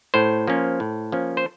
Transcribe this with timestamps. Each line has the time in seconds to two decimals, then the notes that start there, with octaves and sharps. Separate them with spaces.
0.14 A2 C5
0.47 F3 A#3 C#4
0.80 A2
1.12 F3 A#3 C#4
1.37 C5